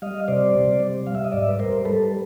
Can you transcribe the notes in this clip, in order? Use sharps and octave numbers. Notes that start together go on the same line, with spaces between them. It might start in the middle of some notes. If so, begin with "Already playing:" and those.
G3 D#5 F5
C3 C5 D5
C3
G3
G3 F5
E5
D#5
G#2 D5 E5
B4
G3 A#4 C5
G3 A4 B4